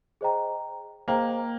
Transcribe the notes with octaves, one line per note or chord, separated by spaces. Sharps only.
G#4 C5 D#5 G5 A#5
A#3 G#4 C5 D#5 G5 A#5